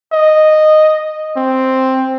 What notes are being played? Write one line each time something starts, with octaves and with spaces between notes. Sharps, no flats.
D#5
C4